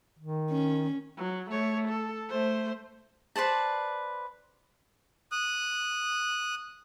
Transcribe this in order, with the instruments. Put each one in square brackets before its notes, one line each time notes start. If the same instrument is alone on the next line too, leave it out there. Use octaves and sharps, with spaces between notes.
[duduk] D#3
[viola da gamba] C#4
[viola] F#3
A3 C#5
A4
A3 C5
[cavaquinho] B4 C5 D5 A5
[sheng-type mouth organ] D#6 F#6